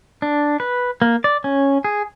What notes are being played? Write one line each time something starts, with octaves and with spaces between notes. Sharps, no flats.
D4
B4
A#3
D5
C#4
G#4